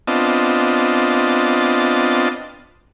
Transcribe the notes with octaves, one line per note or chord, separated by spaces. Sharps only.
B3 C4 D4 F4 D#5 A5